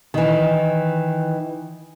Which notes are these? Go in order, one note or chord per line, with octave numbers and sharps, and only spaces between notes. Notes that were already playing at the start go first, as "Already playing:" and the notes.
D#3 E3